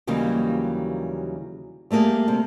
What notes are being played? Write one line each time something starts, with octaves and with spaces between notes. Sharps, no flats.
D#2 C#3 E3 F#3 G3 A#3
G3 A3 A#3 G4 G#4
C3 G3